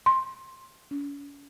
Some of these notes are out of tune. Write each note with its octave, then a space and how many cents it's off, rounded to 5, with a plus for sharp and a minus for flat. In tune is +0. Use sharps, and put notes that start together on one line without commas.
C6 +15
C#4 +40